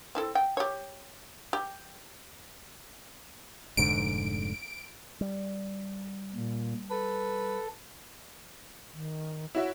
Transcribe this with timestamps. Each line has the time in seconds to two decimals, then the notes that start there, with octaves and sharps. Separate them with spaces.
0.15 C4 E4 A4
0.35 G5
0.57 G4 C#5
1.53 G4
3.77 F1 G#2 D3 D7
5.21 G3
6.35 A#2
6.91 A4 B4
8.93 D#3
9.55 E4 F#4 C#5 E5